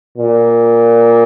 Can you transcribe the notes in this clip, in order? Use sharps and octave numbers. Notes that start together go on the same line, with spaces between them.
A#2